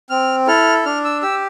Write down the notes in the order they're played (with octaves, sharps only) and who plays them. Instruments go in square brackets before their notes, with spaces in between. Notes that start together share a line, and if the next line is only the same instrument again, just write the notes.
[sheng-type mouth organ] C4 F6
E4 A4 F6
D4 F6
E6
G4 E6